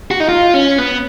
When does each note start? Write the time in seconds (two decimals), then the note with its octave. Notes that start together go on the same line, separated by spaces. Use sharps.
0.11 F#4
0.20 D#4
0.29 F4
0.54 C#4
0.78 B3